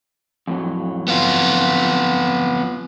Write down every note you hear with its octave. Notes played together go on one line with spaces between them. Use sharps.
F2 A2 F#3
B3 F4